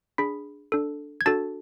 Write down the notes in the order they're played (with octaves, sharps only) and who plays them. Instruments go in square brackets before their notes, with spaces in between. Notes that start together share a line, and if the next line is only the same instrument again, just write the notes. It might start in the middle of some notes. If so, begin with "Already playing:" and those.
[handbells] D4 G#4 B5 B6
D4 A4
G#6
D4 F#4 A4 A5 A6